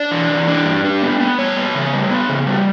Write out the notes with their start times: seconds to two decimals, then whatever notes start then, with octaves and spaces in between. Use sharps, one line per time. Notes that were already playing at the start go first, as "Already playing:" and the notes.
Already playing: D4 D5
0.11 E3
0.30 E3
0.48 D4
0.66 G2
0.84 D4
1.02 B3
1.20 B3
1.38 G3 C#5
1.57 B3
1.75 C#3
1.93 G3
2.11 B3
2.29 C#3
2.47 G3